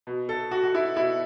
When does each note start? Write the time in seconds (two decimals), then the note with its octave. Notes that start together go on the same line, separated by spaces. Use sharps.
0.07 B2
0.29 A4
0.51 F#4
0.64 F#4
0.75 E4
0.97 B2 E4